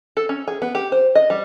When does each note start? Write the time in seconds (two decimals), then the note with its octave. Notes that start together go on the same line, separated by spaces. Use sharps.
0.17 A4
0.29 C#4
0.48 G#4
0.62 B3
0.75 G4
0.92 C5
1.15 D#5
1.30 G3